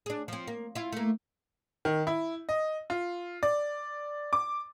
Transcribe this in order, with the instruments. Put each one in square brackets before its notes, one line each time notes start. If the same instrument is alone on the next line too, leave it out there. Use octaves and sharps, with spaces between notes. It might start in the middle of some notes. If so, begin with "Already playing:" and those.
[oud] D4 G#4
F3 C4
A#3
E4 F4
A3 A#3
[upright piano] D#3
E4
D#5
F4
D5
D6